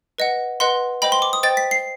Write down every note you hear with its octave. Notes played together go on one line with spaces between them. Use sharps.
B4 D#5 F#5
B4 D#5 F#5 C6
C5 D#5 G5 B5
C6
D6
D#6
C5 D#5 G5 A6
B6
C7